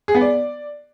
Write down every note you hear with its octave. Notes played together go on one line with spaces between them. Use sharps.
G#4
B3
D5